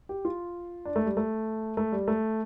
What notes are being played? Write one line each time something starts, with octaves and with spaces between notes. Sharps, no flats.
G4
F4
D4
A3
G3
A3
A3
G3
A3